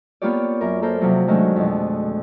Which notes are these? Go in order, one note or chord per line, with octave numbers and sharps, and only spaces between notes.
A#3 B3 F4 G4 C#5 D5
F#2 A#4
A#3 A4 A#4 C5
C3 F3 F#3 A#3
D3 D#3 F#3 G#3 A3 D4
F2 B2